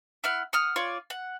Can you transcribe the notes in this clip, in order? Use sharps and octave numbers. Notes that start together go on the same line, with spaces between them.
E4 F#5 F6
F#5 D#6 F6
F4 C#5 D5
F#5